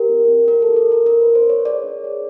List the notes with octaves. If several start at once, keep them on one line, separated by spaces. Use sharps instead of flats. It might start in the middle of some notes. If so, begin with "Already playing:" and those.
Already playing: G4 A#4
C4
C4
C4 A#4
G4 A4
A#4
C4 A#4
D4 A#4
F4 B4
C5
D4 C#5
G#4 D5
D4
G#4